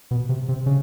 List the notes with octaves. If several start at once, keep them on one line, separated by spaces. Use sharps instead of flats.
B2
C3
C3
C#3